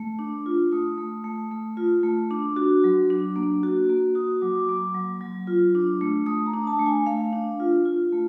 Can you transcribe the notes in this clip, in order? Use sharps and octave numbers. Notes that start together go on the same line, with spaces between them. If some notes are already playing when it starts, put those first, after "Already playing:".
Already playing: A3
D4
F4
A3 D#6
A3
A3
A3
F4
A3
D4
F#4
F#3
D4
A#3
F#4
A#3
F#4 D#6
F#3 D6
A#3
F#3
F#3
F4
D4
A3
A3 D#6
A#5
D4
A5
A3
G#5
A3 F5
D4
F4
F4
A3